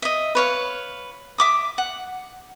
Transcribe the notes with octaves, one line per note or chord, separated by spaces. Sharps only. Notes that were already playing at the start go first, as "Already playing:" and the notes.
D#5 E5
B4 C#5 F5
E5 D6 D#6
F#5